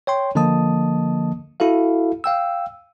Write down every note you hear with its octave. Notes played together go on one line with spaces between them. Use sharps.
C#5 G5 C6
D3 F3 A#3 D#5 A5 D#6
E4 F#4 A4 F5
F5 G5 E6